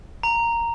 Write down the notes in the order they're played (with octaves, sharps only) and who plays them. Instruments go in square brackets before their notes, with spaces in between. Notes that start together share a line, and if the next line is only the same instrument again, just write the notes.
[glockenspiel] A#5